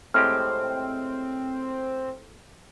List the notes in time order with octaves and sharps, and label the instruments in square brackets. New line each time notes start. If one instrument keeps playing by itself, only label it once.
[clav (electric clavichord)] A2 G#3 G4 [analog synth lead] C4 [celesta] F6